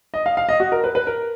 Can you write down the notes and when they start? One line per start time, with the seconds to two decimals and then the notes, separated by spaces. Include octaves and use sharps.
0.14 D#5
0.26 F5
0.37 F5
0.49 D#5
0.60 F#4
0.72 A#4
0.84 B4
0.95 B4
1.07 A#4